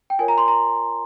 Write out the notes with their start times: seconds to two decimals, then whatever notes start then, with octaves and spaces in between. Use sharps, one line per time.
0.10 G5
0.19 F4 A#4 C#5 G#5
0.28 A#5
0.38 C6
0.48 A#5